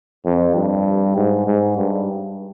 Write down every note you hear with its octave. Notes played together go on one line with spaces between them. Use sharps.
F2
G2
G#2
G#2
G2